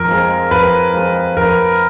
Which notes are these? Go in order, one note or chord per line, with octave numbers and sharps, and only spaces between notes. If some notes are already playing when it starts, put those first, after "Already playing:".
Already playing: F2 A#4
F3 G#3
F2 B4
F3 G#3
F2 A#4